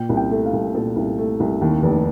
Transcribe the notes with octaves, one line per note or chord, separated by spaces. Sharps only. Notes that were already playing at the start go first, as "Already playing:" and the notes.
Already playing: A#2 G5
C2
G5
A3
F5
C2
A#2 A4
C2
A3
C2
D#2
F1